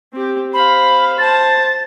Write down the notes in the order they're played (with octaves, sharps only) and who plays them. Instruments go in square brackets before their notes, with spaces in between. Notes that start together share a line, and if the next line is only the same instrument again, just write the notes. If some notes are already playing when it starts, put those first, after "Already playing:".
[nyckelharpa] C4 G4
[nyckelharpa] C5 F5 [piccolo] B5
[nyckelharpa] C5 A5 [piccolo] A6